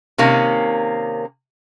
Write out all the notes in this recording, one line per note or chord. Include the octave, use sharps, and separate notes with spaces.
C3 D#3 A#3 C#4